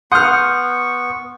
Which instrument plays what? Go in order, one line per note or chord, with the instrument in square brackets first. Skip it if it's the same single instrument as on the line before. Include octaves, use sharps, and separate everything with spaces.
[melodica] B3 C#6 [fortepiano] F#5 F6 [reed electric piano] C6 D#6 G6